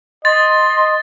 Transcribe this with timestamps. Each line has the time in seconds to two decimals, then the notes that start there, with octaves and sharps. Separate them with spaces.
0.25 D#5 C6 A6